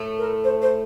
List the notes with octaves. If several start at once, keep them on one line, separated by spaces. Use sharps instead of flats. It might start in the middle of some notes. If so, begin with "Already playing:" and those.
Already playing: A2 A3
A#4
C5
C5